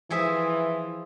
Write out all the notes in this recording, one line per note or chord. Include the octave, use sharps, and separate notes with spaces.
E3 F3 G#4 E5